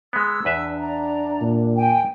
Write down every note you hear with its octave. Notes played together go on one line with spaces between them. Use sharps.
G#3 B3 E6
E2 D4 B4 E5
D5 A#5
A#2
G5 G#5